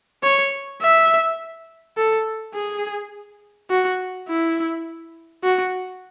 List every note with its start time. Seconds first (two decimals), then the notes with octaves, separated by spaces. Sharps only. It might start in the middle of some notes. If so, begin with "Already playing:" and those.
0.23 C#5
0.81 E5
1.97 A4
2.55 G#4
3.70 F#4
4.28 E4
5.43 F#4